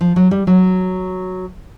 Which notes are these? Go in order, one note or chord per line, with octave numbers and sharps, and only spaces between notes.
F3
F#3
G3
F#3